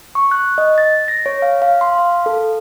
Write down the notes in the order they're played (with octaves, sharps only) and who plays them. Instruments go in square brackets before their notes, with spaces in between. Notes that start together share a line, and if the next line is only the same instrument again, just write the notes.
[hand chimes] C#6
F#6
D#5
A6
A#6
C#5
F5
F5
C6
F5
A4